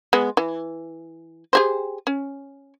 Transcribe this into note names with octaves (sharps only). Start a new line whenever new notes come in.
G#3 B3
E3
G4 G#4 C5
C#4